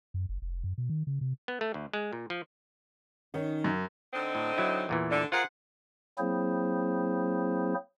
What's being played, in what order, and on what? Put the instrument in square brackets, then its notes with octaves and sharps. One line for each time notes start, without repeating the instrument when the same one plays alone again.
[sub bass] F#2
F#1
F1
F#2
B2
D#3
C#3
C3
[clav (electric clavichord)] B3
A3
D2
G#3
A#2
F3
[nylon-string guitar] D#3 C#4 D#4
[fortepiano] F#2
[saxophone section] D3 C4 D#4
[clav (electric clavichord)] A2
F#3 E4
E2 A#2 E3
[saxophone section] D3
[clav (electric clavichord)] F4 A#4 [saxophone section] G#4 C5 F#5
[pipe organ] F#3 A#3 C4 E4 G#4 C5